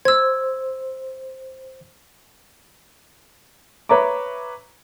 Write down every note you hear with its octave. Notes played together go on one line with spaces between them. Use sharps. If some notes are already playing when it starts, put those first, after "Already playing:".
C5 E6 G#6
B4 C#5 E5 A#5 D6